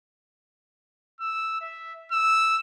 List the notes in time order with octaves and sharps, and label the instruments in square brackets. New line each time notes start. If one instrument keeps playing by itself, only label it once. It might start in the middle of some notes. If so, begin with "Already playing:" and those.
[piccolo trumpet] E6
E5
E6